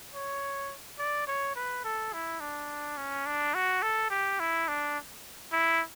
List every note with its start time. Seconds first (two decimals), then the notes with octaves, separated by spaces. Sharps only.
0.14 C#5
0.99 D5
1.27 C#5
1.55 B4
1.84 A4
2.13 E4
2.40 D4
2.97 C#4
3.26 D4
3.54 F#4
3.82 A4
4.10 G4
4.40 E4
4.68 D4
5.52 E4